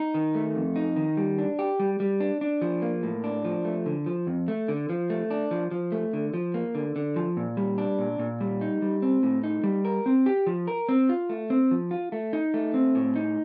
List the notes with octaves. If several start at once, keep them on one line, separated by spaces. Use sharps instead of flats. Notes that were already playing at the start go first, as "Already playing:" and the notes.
Already playing: D#4
D#3
A3
F2
D#4
D#3
G3
D4
G4
G3
G3
D4
D4
F3
A#3
A2
D4
F3
A3
D3
F3
F2
A3
D3
F3
A3
D4
F3
F3
A3
D3
F3
A#3
D3
D3
F3
A#2
G3
D4
A#2
A#2
G3
D#4
G3
C4
A2
D#4
G3
A#4
C4
G4
F3
A#4
C4
F4
A3
C4
F3
F4
A3
D#4
A3
C4
A2
D#4